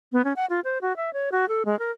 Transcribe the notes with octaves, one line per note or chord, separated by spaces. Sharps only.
B3
C#4
F#5
F4
C5
F#4
E5
C#5
F#4
A4
G#3
A#4